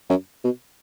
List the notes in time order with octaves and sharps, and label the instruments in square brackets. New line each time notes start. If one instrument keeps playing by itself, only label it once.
[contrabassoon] F#2
B2